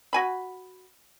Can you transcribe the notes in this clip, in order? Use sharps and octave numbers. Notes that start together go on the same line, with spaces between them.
F#4 G#5 B5